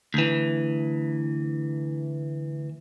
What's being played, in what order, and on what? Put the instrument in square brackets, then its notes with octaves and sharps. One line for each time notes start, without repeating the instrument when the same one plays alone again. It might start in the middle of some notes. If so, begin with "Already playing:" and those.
[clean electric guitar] D2 E3